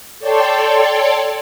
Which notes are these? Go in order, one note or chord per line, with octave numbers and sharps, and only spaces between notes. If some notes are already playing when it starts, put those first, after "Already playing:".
A4 C#5 D5 G5 A5 C6